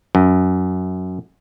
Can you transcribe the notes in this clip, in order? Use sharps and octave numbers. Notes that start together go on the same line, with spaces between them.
F#2